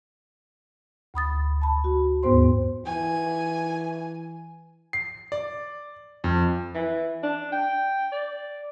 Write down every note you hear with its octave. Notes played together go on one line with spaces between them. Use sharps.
D2 B5 D#6 A6
A5 B5
F#4
D#2 G#2 B3 C5 C6
E3 G#5
C7
D5
F2
E3
D4
G5
D5